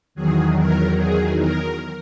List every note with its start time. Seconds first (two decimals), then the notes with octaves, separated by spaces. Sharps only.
0.15 E2 D#3 F#3 G#4
0.57 A#4
0.97 G#4
1.38 A#4